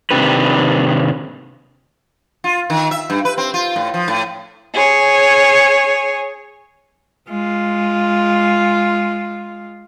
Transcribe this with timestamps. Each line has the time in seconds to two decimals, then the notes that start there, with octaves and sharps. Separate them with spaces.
0.11 C3 D#3 D4 G4 B4
2.44 F4
2.70 D#3
2.91 E5
3.10 G2
3.25 B4
3.38 C4
3.54 F4
3.76 A2
3.94 F3
4.08 A2
4.73 G#4 C#5
7.30 G#3 F4